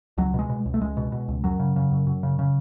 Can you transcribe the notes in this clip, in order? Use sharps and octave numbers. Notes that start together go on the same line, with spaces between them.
C#2 F#3
B2 G#3
B2
C#2
A3
C#2 G#3
B2
B2
C#2
F#2 F#3
C#3
C#3
F#2
F#2
C#3
C#3